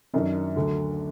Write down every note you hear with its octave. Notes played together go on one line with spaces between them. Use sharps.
F#2 D#3 F#3 D4
D2 D3 F#3